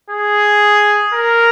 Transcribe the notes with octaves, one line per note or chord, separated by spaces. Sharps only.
G#4
A#4